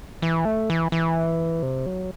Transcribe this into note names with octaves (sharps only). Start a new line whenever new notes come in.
E3
A3
E3
E3
C3
F#3